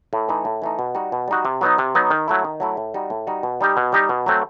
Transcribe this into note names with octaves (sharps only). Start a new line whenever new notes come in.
A2
E3 A3 D#4
A2
E3 A3 D#4
B2
G3 D#4 F#4
B2
G3 D#4 F#4
C3
F#3 B3 D#4
C3
F#3 B3 D#4
D#3
F#3 A3 E4
D#3
F#3 A3 E4
A2
G3 D#4 F#4
A2
G3 D#4 F#4
B2
G3 D#4 G4
B2
G3 D#4 G4
B2
F#3 A3 C4